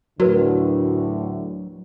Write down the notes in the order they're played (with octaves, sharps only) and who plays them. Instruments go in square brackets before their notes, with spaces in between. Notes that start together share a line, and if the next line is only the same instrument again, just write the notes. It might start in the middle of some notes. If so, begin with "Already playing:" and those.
[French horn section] D2 A2 D3 [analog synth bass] F#3 [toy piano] F#4 A#4 B4